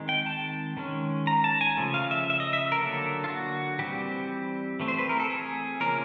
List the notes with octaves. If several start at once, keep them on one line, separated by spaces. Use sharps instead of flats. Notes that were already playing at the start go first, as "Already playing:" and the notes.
Already playing: D#3 G#3 C4
G5
A5
D#3 G#3 C#4
A#5
A5
G#5
C#3 F3 A3
F5
E5
E5
D#5
E5
A#4
D3 F#3 A#3 A4
F4
F#4
E3 G3 C4 G4
E3 A3 C4
C5
B4
A#4
A4
G#4
C#3 F3 A#3 C#4 A#4